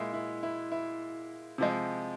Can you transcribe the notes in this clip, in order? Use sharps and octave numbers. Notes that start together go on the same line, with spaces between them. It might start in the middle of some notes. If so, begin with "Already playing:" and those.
Already playing: A#2 G#3 E4
E4
E4
E4
C3 F3 G#3